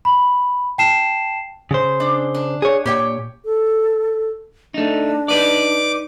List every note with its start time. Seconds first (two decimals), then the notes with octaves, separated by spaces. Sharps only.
0.05 B5
0.78 G5 A5 C7 E7
1.71 C#3 C5
2.00 D4
2.34 D4
2.62 G#4 C#5
2.86 A#2 G4 C#5 G5
3.45 A4
4.74 A3 D4 D#4
5.28 D#4 B4 D5 D6